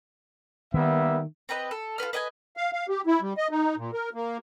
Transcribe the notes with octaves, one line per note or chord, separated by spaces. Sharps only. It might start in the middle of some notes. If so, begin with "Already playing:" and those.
D#3 G3 A#3 B3 E5
C4 G4 B4 D#5
A4
F4 A4 B4 F6
B4 D#5 G5 G#5
F5
F5
G4
E4
G3
D#5
D#4
A#2
A#4
A#3